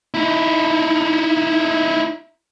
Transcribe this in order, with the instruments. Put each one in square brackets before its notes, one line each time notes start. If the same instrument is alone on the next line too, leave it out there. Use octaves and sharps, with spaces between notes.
[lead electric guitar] D#4 E4